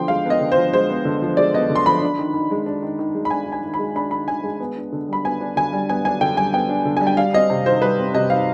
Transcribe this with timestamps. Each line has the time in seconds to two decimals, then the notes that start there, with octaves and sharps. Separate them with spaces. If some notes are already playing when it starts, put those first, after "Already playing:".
Already playing: D3 F3 B3 G5 C6
0.08 G#3 F5
0.25 B3 D#5
0.41 D3
0.52 C5
0.57 F3
0.73 G#3 C5
0.89 B3
1.05 D3
1.22 F3
1.37 G#3 D5
1.54 B3 D#5
1.70 D3
1.76 C6
1.86 F3 B5
2.02 D4
2.19 D#3
2.34 D#3
2.51 G#3
2.66 D4
2.82 D#3
2.99 D#3
3.15 G#3
3.25 B5
3.31 D4 G#5
3.47 D#3
3.52 G#5
3.64 D#3
3.74 B5
3.79 G#3
3.96 D4 B5
4.11 D#3 B5
4.27 D#3 G#5
4.44 G#3
4.60 B3
4.77 D4
4.92 D3
5.08 G3 B5
5.24 B3 G#5
5.41 D4
5.56 D3 G#5
5.73 G3
5.89 B3 G#5
6.05 D4 G#5
6.21 D3 G5
6.37 G3 G#5
6.53 B3 G5
6.69 D4
6.85 D3
6.97 G3 G#5
7.07 G5
7.17 G3 F5
7.33 C4 D#5
7.50 C3
7.66 D#3 C5
7.82 G3 B4
7.98 C4
8.14 C3 D#5
8.30 D#3 F5